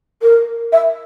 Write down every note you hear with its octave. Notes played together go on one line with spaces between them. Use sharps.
A#4
E5